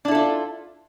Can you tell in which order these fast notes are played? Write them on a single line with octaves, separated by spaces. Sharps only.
D4 E4 A4 F4